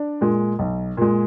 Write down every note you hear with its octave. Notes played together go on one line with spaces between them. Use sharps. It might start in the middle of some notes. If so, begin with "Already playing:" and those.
Already playing: D4 D5
A#2 G#3
B1
A#2 G#3